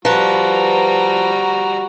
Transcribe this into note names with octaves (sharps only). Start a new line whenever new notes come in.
F3 G3 F#4 B4 A#5